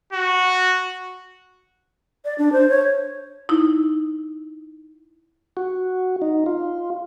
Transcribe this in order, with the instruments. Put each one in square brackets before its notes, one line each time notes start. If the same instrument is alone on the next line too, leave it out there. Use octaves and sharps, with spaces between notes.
[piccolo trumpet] F#4
[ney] D5
D4
C5
C#5
[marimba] D#4 E4
[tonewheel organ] F#4
D#4
F4